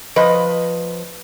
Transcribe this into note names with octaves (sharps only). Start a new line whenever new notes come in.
F3 B4 D#5